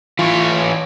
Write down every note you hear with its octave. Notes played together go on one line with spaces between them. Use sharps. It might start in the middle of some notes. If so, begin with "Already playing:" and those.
E3 F4 C#5